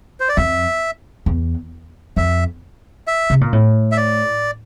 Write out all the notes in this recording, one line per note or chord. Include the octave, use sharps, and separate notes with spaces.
C5
D5
F2 E5
E2
F2 E5
E5
C3
A#2
A2
E5
D5